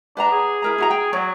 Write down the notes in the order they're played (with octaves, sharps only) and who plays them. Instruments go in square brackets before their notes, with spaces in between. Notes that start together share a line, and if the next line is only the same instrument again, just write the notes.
[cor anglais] D4 [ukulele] B4 F#5 A#5
[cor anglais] G#4
[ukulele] E4 A#4 A#5
E4 F#4 A#5
G5
[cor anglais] F#3 [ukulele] C#5 D5